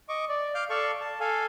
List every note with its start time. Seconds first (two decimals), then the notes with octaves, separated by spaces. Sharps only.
0.09 D#5 C#6 D6
0.29 D5
0.55 F5 D6 F6 G6
0.70 A4 D5 F5 A5 C#6
1.01 A5
1.20 A4 F5 G#5